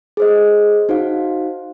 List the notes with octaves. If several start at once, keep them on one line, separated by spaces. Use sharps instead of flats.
G#4 C5 D#5
D#4 F#4 C5 F5